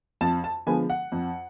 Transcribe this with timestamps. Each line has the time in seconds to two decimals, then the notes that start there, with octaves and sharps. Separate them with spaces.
0.21 F2 A5
0.44 A5
0.66 D3 F3 G#3 B3 G#5
0.90 F#5
1.12 F2